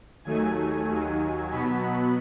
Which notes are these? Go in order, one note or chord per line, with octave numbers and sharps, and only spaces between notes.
D#2 D#3 F#3 A3 G#5
D#2 D#3 F#3
B2 F#3 B3 B5